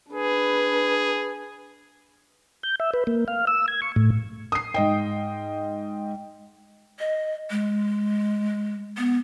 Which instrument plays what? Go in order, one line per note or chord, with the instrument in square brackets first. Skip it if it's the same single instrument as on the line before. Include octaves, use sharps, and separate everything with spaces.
[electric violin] D4 B4 [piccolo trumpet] G#4
[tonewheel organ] G6
E5
B4
A#3
F5
E6
G#6
C#6
A2
[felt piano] D#6 C7
G#2 D#5 G5
[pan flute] D#5
G#3
B3